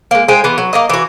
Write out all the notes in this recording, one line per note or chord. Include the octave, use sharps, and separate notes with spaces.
G#3 A#3
G#3 C5 G5 G#5
E3 B3
F#3
A#3 A#4 D#5
E3 F#4